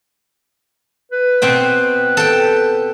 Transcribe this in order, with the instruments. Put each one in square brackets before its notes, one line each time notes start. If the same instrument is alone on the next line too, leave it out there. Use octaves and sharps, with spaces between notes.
[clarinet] B4
[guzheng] B2 C4 G5
A4 G5